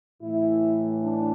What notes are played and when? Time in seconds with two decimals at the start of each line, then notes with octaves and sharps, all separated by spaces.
0.21 A2 E3 E4
1.01 D4